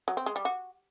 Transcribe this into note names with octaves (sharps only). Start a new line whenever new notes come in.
F#3
C4
G#3
G3
F#4